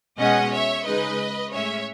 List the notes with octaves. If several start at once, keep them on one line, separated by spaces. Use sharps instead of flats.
B2 G#3 C#4 D#5 F#5
C#5 E5
C#3 G#3 D#4 B4 D#5
A2 G#3 C#4 C#5 E5